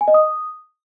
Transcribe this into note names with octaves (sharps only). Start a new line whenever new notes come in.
G#5
D#5
D#6